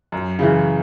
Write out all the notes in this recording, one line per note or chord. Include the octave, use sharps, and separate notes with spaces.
F#2
C#3 E3